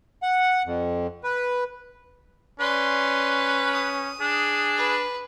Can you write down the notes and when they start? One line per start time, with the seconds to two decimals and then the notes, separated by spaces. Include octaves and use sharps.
0.22 F#5
0.66 F2
1.24 B4
2.60 C#4 B4 D5 C6
3.73 D#6
4.21 D4 G#4
4.78 B4